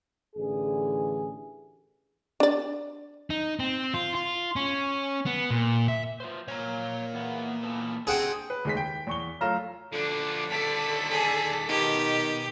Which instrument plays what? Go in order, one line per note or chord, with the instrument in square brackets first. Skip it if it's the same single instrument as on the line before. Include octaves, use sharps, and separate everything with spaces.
[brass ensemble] A1 D3 E3 G#4
[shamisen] D4 D5
[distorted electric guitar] D#4
C4
F4
F4
C#4
B3
A#2
E5
[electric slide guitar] F4 B4 C5
[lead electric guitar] A#2 A#3 [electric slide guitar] C#5 A#5
[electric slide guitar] E2 B3
E3 B3 A4
[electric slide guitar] C4 C5 [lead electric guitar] D4 F#4 [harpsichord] G#4 F#5 G5
[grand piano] B4
D#2 G#3 B6
G5
E2 C#6 G7
F#3 A3 F4 A#5 F6 E7
[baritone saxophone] D3 [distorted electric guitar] F3 D4
[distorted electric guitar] D#2 D5 [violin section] A4 B6
[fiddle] G#4
[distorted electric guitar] B2 [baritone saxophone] D#3 [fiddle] G4